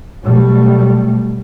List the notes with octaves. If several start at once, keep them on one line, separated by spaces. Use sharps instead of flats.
B2 F#3 G3 A3